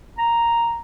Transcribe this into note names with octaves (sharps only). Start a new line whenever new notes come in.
A#5